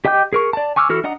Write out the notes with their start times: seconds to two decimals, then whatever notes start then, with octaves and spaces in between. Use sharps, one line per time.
0.05 G4 D#5 G5 D6 G6
0.33 G#4 A#4 C#6
0.53 D5 A5
0.76 G#5 C#6 D6 E6 F6
0.89 E3 F#4 A4 F6
1.04 D4 D#5 F#5 A#5 D#6